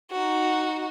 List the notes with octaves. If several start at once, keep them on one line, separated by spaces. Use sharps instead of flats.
D#4 F#4